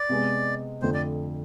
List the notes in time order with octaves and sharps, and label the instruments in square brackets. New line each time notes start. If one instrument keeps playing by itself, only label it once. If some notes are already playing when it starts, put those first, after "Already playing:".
Already playing: [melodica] D5
[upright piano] C3 G#3 B3
[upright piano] F2 D3 A3 [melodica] C5
[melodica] D5